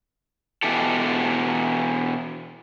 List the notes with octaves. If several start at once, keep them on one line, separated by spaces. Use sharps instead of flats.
B2 E3 G4 A4